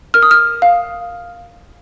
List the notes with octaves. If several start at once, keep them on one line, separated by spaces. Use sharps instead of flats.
A#4 F6
D#6
F6
F5